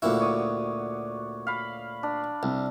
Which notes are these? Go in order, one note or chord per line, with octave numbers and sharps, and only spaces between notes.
D2 A#2 E4 F#4 D5
C#5 D5 D#6
F5 B5
D4
C2